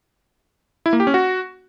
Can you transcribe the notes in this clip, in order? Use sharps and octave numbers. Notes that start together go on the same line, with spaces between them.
E4
A#3
G4
C#4
F#4